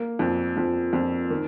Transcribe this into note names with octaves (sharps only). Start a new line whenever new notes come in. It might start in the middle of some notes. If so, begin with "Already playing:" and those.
Already playing: A#3
F2
F2
F2
D#3